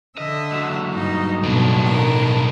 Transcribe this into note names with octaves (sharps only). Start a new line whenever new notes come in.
D3 D#5 E5
F#3 G#3
G2 D#4
B1 A2 B3 D4
D#3 A#4